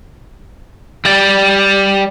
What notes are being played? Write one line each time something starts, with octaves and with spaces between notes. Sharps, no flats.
G3 D5